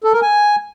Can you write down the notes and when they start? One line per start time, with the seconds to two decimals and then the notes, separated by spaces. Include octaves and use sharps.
0.04 A4
0.13 A#4
0.22 G#5